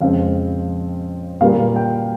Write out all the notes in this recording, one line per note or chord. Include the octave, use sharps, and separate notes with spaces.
F2 C#3 G#3 C4 F5
A#2 G3 A#3 F5
G5